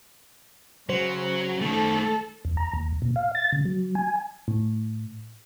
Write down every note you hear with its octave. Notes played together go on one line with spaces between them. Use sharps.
C#3 F#3 C5
D#3 A3 A4
E2
A#5
D#2
A#2
F5
A6
C#3
F#3
G#5
A2